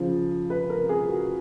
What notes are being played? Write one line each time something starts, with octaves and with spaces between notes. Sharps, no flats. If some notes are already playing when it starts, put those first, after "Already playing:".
Already playing: C#3 F3
B4
A#4
G#4
F#4